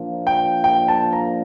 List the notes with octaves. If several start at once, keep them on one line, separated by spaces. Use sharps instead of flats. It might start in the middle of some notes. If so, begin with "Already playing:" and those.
Already playing: A#2 F3 A#3 D4 F4
G5
G5
A5
A#5